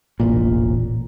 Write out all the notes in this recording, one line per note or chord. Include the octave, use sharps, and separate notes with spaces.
E1 A1 A#2